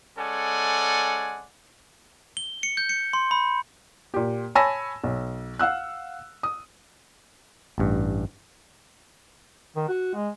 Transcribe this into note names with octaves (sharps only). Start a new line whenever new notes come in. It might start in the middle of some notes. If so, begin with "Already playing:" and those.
G#3 C#4 A4 D5 F#5 G#5
G7
C#7
G6
C#7
C6
B5
A#2 G4
C#5 G#5 A5 B5 E6 A#6
B1
F5 F#5 E6 F#6
D#6
A1 G2
D#3
F#4
G#3